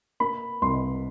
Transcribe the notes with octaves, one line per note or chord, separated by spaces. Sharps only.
A#3 B5
C2 C6